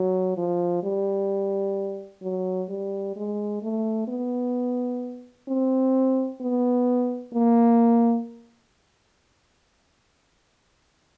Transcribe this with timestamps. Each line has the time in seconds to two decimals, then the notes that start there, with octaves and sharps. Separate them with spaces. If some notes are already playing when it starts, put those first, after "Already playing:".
Already playing: F#3
0.37 F3
0.83 G3
2.22 F#3
2.69 G3
3.16 G#3
3.62 A3
4.08 B3
5.49 C4
6.41 B3
7.34 A#3